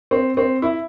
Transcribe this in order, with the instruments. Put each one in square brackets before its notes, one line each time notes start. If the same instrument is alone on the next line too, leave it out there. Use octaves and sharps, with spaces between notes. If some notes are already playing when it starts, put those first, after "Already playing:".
[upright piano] C4
C4
E4